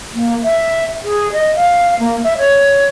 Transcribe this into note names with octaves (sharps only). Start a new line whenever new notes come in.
A#3
E5
G#4
D#5
F5
A#3
E5
C#5